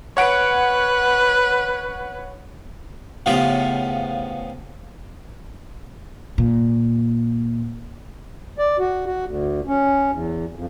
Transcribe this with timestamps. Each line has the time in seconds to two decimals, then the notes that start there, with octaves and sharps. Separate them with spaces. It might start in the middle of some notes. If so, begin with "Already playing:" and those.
0.17 B4 C#5 F#5 D7
3.26 A2 C#3 F3 B3 F4 G4
6.38 A#2
8.58 D5
8.79 F#4
9.06 F#4
9.25 D2
9.67 C#4
10.12 E2
10.55 F2